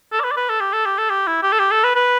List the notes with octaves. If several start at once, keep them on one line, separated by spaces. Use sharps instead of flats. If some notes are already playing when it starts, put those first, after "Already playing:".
A4
D5
B4
D5
B4
A4
G4
A4
G4
A4
G4
E4
G4
A4
G4
A4
B4
B4